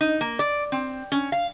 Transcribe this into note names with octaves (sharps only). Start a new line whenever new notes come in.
D#4
A#3
D5
C4
C#4
F5